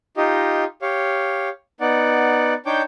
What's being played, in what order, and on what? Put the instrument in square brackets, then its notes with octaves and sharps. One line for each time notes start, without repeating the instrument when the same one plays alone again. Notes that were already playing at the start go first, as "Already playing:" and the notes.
[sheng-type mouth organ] D#4 F4 G4 D#5
G4 C#5 F5
B3 D#4 D5 F#5
D4 D#4 C#5 G5 D6 G6